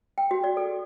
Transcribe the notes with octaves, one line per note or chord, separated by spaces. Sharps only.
G5
F#4
D5
A4